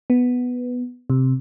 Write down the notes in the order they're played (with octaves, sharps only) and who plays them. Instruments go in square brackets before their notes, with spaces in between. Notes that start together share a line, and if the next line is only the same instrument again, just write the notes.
[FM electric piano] B3
C3